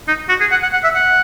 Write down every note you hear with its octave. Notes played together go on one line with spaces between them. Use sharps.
D#4
F#4
G#4
F#5
F#5
F#5
E5
F#5